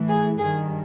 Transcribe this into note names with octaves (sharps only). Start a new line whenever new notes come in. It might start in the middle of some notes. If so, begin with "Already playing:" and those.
Already playing: A2 E3
G#4
G2 D#3 G#4